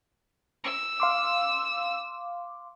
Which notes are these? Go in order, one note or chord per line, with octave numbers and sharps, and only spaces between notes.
E6
F5 C6 D6